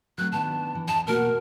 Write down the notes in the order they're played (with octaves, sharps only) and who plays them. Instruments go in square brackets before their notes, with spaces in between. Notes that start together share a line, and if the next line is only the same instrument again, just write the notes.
[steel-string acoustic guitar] F#3 A3 C4 [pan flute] F#6
[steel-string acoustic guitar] D#3 B3 D4 [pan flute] A5
[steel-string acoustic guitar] E3
[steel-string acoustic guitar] E2 D#5 [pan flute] A5
[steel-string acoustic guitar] B2 A#3 F#4 [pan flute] A#4